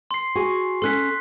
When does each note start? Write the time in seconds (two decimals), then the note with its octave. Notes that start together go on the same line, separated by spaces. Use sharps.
0.11 C6 C7
0.35 F#4 G#4 G#5
0.82 C#4 A4 C6 F#6 B6